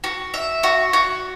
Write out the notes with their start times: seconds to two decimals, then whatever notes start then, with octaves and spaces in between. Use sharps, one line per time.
0.04 F#4
0.34 E5
0.63 F#4
0.93 F#4